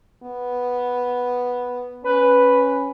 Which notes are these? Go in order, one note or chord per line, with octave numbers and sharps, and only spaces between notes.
B3
C#4 B4